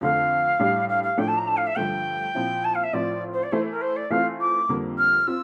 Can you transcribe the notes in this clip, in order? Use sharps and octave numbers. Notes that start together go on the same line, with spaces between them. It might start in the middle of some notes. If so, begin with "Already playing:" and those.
F2 D3 A3 F5
A2 G3 D4 G4
F5
F5
A2 F3 A3 D4 G5
A5
A#5
A5
F5
E5
G2 D3 F3 A3 G5
A#2 F3 C4 E4
A5
F5
E5
A2 F3 C4 F4 D5
C5
D5
E3 A3 E4 C5
A#4
C5
D5
E3 A3 C4 F4 F5
D6
F2 D3 G3 A#3
F6
C4 F4 E6